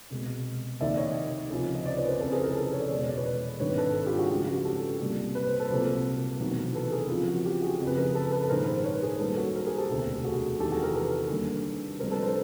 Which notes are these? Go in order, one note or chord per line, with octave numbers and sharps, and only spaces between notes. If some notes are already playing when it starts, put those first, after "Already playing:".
C2 B2 G#3
F1 D#2 D#3 D5 E5
C#5 D#5
C#2 C3 F3
D#5
C5 D5
B4 C#5
A#4 C5
F1 F2 C#3 E3 A4 B4
G#4 A#4
G#4 A#4
A4 B4
C#5
D5
C#5
E2 B2 G#3 D5
C#5
D5
B4 C#5
G#1 G2 D#3 B4 C#5
A4 B4
F4 G4
F#4 G#4
F#2 C#3 F3 G#3 F#4
F#4
G4 A4
C2 A#2 G3 A#3
B4
C5
A4 B4
C2 A#2 F#3 A#3
E1 E2 C3 D#3 F#3
A4 B4
G#4 A#4
F2 C#3 F3 F4
F#4
F4 G4
F#4 G#4
F#1 F2 C#3
B4
G#4 A#4
A4 B4
A4 B4
B4
A#1 G#2 D#3 G#3 A#4 C5
A#4 C5
B4 C#5
G#4 A#4
F#2 D#3 G3 A#3 A4 B4
F#4
A#4 C5
G#4 A#4
G4 A4
E1 D2 C3
F#4 G#4
E2 C3 D#3 G4 A4
F#4 G#4
G#4 A#4
A4 B4
D#2 D3 G3 A#3
F1 F2 D3 G3 A#4 C5
A4 B4
A#4 C5